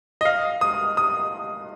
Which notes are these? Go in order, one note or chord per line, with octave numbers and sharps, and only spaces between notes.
D#5
F5
D#6
D#6